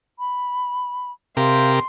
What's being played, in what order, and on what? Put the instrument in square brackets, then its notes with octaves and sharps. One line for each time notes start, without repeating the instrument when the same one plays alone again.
[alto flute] B5
[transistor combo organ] C3 G4 A#4 [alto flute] F5 [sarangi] C6